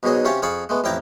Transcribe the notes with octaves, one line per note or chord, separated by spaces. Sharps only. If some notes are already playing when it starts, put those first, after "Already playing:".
B1 G#2 B2 F#3 G#4 D#5
C3 C#4 G4 C#5 F5 A5
F2 G#4 F5 A5 B5 C#6
G#3 A3 B3
A1 F2 E4 G5 A#5 D6